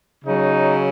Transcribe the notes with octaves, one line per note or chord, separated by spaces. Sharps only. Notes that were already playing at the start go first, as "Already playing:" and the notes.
C#3 F#3 D#4